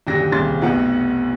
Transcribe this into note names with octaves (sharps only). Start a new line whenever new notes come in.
D#1 F#2 D3 G4 G5 A#6
D#1 C2 C#3 C6 A6
F1 B1 F3 B3 F#5 G5